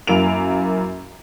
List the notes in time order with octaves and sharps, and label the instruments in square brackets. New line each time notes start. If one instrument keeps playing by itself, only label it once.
[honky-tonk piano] F#2 A#3 E4 D7 F7